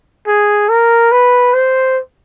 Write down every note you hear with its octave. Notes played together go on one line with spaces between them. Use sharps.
G#4
A#4
B4
C5